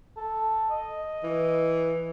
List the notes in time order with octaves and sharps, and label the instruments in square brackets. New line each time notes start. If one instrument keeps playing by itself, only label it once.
[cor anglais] A4
D#5
[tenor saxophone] E3